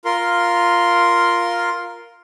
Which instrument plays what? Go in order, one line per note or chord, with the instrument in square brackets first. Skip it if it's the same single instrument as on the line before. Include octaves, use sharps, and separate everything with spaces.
[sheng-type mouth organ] F4 A#4 C6